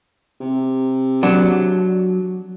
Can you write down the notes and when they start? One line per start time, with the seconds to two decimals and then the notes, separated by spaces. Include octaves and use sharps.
0.41 C3
1.23 F#3 D4